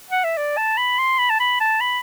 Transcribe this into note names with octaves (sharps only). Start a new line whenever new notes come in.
F#5
E5
D5
A5
B5
C6
B5
A5
B5
A5
B5